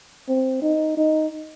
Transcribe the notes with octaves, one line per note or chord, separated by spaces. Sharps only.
C4
D#4
D#4